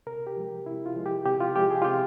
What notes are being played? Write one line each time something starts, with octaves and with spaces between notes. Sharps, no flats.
C3 A#4
G4
F3 G#3
C3 E4
F4
F3 G#3
G4
C3 G4
F4
F3 G#3 G4
G#4
F4
C3 G4